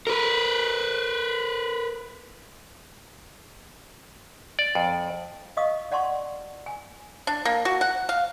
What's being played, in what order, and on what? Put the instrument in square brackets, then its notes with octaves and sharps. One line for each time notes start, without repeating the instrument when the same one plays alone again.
[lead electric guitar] A#4 B4
[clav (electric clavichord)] D5
F2
[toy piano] D#5 F5 C#6 D#6
D5 F#5 A5 C6 C#6
G#5
[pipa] D4
A#3
F#4
F#5
F5